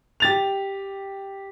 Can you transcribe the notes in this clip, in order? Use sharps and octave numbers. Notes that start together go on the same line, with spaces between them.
G4 A6 F7